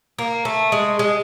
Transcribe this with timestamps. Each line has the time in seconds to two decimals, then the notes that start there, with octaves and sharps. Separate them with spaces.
0.19 A#3
0.45 A3
0.72 G#3
0.99 G#3